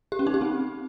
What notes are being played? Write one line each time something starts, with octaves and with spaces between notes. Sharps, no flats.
G4
C#4
D#4
G4
C4